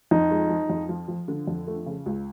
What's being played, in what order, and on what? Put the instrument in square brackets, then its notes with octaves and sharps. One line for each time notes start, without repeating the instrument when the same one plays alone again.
[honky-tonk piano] F2 [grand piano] D#4
[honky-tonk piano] G#3
F3
F2
F3
F3
D3
F2
A3
C#3
C#2